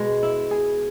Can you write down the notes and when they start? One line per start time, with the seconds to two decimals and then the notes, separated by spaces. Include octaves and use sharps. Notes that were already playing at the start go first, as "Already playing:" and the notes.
Already playing: B2 G#3
0.23 E4
0.51 G#4